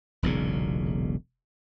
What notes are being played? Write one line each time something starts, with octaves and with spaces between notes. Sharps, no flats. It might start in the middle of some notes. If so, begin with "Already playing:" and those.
E1 B1 A#2 C#3